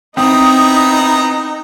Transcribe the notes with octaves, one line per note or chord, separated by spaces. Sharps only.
B3 C4 D#4 E4 A#5 D#6